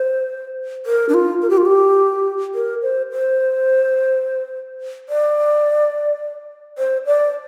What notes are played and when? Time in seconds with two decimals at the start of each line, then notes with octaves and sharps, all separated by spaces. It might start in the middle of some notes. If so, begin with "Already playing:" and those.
Already playing: C5
0.86 A#4
1.09 D4
1.14 F4
1.42 A#4
1.50 G4
1.57 F4
1.65 G4
2.54 A#4
2.82 C5
3.12 C5
5.09 D5
6.78 C5
7.06 D5